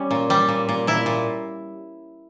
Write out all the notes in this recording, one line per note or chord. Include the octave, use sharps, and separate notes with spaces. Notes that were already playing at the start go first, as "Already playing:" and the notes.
Already playing: G3 C#4
A#2
G3
A#2
A#2
A#2 E4
A#2